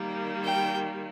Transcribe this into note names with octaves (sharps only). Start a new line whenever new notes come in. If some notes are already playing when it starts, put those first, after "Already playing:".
Already playing: D#3 G3 A#3
G5